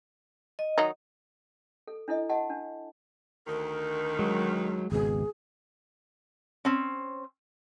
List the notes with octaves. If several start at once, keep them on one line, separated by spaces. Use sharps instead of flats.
D#5
D#3 F#3 D#4
A4
D4 E4 A4 D#5
F#4 D#5 F#5 A5
D4
D2 D#3 A#4
F#3 G#3
G#1 C#2 B2 G#4
C4 C#4